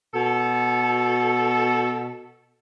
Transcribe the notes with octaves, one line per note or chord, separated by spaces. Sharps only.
B2 A4